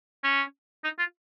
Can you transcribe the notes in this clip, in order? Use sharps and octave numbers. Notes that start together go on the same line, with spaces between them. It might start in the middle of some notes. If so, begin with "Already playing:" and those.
C#4
D#4
F4